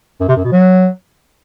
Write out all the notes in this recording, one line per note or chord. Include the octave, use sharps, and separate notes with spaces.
F#2
C3
F#2
B2
F#3